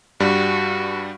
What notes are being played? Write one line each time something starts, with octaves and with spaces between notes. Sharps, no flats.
G2 G3 F#4